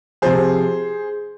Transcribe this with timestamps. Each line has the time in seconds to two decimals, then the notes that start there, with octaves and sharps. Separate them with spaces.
0.22 C3 F3 G#4 C5